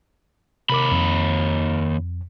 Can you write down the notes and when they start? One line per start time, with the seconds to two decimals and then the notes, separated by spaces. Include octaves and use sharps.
0.70 D#2 C3 A#4 B5 D6
0.91 F2